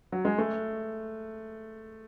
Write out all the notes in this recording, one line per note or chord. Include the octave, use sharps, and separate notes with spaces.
F#3
G#3
A3